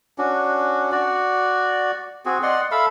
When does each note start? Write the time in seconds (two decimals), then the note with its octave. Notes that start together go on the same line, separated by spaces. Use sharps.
0.18 C#4 D4 F#4
0.92 F#4 D5
2.25 C4 F#4 G#4
2.43 D5 D#5 F#5 C6
2.71 A4 E5 F5 B5